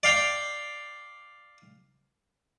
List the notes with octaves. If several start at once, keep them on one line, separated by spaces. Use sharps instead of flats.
D5 F5 G5